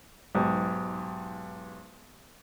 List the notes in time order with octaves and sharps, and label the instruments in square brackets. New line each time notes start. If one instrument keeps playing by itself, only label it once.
[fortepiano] B1 G#2 G4